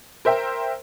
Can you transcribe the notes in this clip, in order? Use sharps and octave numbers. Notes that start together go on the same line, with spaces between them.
A#4 C5 E5 G5